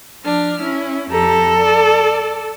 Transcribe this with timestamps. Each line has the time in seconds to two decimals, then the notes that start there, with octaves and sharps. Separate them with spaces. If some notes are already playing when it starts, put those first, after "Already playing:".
0.23 F3 D4 F6
0.61 C#4 E4
1.11 F2 G4 A4 A#5
1.56 D5